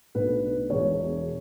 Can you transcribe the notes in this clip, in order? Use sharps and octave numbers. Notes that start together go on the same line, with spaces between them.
B1 B2 A3 D4 B4
E1 E2 B2 C#5